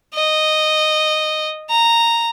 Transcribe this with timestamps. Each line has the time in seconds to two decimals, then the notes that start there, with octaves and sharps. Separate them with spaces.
0.14 D#5
1.70 A#5